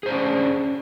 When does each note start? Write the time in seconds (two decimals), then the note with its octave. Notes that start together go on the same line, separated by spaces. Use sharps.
0.03 G#4
0.06 C5
0.09 D4
0.12 C#4